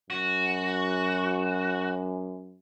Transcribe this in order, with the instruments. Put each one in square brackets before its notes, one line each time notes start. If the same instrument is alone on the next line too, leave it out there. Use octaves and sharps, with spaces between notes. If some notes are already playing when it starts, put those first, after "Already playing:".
[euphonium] F#2 [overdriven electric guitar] F#4